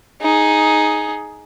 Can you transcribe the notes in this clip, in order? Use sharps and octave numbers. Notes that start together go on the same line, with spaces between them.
D#4 G#4